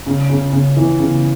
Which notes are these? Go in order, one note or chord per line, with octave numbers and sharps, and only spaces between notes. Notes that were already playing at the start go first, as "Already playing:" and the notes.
C#3
C#3
C#3
E3
C#3